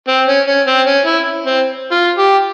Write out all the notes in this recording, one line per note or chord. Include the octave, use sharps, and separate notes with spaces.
C4
C#4
C#4
C4
C#4
E4
C4
F4
G4